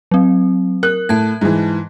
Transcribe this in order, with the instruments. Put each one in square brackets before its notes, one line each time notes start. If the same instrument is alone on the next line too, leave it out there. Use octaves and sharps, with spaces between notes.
[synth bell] F#3 C4
[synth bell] A#4 [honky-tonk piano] F#6
[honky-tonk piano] A2 [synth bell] A5 G#6
[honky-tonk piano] G#2 E3